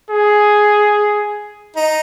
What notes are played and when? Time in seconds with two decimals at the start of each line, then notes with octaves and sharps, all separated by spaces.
0.10 G#4
1.76 D#4